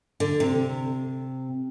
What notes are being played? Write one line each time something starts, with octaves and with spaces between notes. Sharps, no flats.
D3
C3